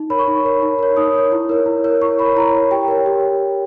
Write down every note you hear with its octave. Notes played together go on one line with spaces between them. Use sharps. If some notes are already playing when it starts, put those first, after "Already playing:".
Already playing: D#4
A#4 C#5 B5
C#6
D#4
A#4 C#5
D#4
A#4 C#5
D#4 D#6
A#4 C#5
E4
A#4 C#5
E4
A#4 C#5
E4 C#6
A#4 C#5 B5
E4 A#5
A#4 C#5
G4 G5
A#4 C#5
G4